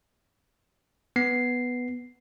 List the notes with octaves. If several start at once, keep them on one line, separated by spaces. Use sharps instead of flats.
B3 C7